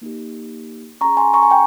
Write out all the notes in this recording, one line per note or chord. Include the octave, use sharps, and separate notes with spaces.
A#3 D#4 G4
C#4 G#4 A#5 C#6
G#5 C6
A#5 C#6
G#5
G5 A#5